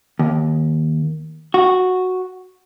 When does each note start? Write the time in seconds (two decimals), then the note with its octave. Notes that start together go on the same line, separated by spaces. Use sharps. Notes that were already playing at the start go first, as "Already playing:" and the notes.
0.19 D#2
1.54 F#4